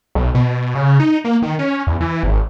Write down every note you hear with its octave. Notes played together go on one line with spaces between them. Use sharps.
B1
B2
C#3
D#4
A#3
D#3
C#4
E2
E3
G#1